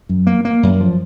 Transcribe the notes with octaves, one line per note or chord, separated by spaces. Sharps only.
F#2
A#3
A#3
F#2
F3